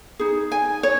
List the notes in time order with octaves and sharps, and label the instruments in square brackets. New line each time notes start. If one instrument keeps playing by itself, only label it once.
[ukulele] D#4 G#4
G#5
C#5